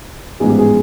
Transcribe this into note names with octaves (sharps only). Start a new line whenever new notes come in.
A1 G#2 F3 G#3 B3 G#4
G4
G#4